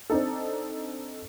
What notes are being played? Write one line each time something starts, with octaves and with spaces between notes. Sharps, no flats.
C4 D4 D#4 A4